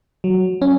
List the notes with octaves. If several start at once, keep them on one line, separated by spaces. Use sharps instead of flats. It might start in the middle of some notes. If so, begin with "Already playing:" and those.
F#3
C#4